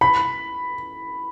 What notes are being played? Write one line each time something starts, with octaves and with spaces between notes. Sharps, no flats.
B5